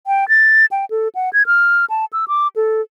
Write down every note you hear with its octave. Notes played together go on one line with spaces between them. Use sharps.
G5
A6
G5
A4
F#5
G#6
F6
A5
E6
D6
A4